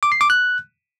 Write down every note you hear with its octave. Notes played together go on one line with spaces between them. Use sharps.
D6
C7
D6
F#6